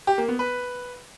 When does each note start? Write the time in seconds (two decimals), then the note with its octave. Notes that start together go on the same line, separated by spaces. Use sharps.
0.07 G4
0.18 A#3
0.29 B3
0.39 B4